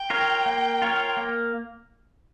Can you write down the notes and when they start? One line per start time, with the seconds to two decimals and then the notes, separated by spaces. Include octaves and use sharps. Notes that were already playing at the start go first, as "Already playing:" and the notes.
Already playing: G5
0.10 F4 A#4 C#5
0.46 A#3
0.82 F4 A#4 C#5
1.17 A#3